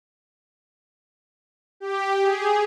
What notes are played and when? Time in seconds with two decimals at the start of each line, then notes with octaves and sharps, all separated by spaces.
1.80 G4
2.23 G#4